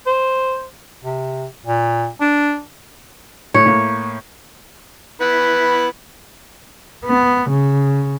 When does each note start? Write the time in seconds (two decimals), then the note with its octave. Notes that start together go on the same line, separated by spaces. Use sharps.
0.07 C5
1.04 C3
1.66 A#2
2.21 D4
3.54 A2 C#5
3.66 A2 A#3
5.21 B3 E4 B4
7.06 B3
7.50 C#3